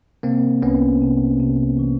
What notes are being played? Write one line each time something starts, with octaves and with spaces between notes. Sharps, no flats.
C3 A#3 C4
C2 B3 C#4
C3
C3
E3